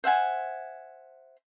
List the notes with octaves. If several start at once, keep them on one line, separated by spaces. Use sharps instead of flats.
C5 E5 F#5 G#5